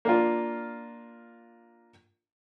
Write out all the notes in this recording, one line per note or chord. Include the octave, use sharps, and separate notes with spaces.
A#3 D4 F4